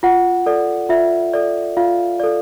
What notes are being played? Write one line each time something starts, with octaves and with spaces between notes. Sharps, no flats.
F4 F#5
A4 D5
F4 E5
A4 D5
F4 F5
A4 D5